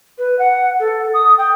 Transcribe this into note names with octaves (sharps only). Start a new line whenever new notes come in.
B4
F#5
A4
D#6
G5